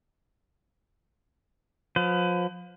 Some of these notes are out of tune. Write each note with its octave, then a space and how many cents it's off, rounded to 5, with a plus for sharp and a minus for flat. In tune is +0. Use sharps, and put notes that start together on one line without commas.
F3 +35 B4 +35